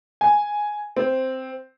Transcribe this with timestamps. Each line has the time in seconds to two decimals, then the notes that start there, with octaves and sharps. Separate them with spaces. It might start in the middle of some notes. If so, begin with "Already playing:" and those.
0.21 G#5
0.97 C4